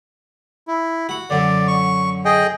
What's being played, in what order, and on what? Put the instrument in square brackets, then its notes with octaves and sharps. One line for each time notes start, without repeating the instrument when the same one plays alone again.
[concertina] E4
[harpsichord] F#4
[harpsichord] F#2 D3 [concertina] D5
[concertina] C#6
G#4 D#5 G5